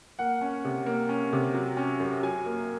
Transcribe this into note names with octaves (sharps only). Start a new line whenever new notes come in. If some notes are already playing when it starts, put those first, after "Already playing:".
A#3 F#5
C#4
C3
A#3
C#4
C3
F#3
C#4
F#2
F#3 G#5
A#3